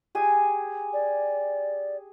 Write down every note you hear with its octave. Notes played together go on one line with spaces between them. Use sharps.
G4 G#4 G#5
D5